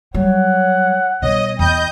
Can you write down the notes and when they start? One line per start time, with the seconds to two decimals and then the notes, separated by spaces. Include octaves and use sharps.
0.14 F#3 G3 C#5 F#5
1.22 B2 G3 C#5 D#5
1.59 E2 D#5 G5 B5 G6